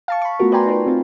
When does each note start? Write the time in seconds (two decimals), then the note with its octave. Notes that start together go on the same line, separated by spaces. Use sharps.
0.08 F5 A5 C#6
0.22 B5 C#6
0.39 A3 B3 F4 F#4 A#4
0.52 B4 D5 G5 G#5 A#5 C6
0.66 D#4 F4 A#4 B4
0.86 C4 F4